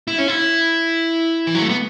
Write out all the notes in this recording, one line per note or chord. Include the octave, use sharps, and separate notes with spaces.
E4
C#4
E4
E3
F#3
A3
B3